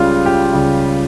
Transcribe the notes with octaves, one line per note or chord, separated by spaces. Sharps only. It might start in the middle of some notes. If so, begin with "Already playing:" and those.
Already playing: C#2 C#3 G3 F4
G4
C#2 C#3 G3